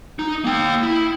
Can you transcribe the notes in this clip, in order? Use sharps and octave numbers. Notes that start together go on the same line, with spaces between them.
D#4
A#3 G5
E4